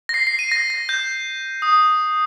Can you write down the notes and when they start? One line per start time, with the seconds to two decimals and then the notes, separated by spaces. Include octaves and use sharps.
0.09 A#6
0.14 C7
0.27 C7
0.39 D#7
0.52 A#6
0.70 A#6
0.89 G6
1.62 D#6